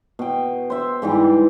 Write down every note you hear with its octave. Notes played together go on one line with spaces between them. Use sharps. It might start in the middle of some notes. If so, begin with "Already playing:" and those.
B2 G5
C5 E5
G#2 E3 G3 G4